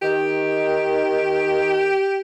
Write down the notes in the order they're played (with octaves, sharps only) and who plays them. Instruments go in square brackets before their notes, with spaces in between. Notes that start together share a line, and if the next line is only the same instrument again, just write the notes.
[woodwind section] D#3 [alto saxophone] G4